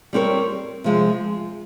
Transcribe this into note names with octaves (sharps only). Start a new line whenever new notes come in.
G3 C4 G4 A#4 C#5
C3 F3 G#3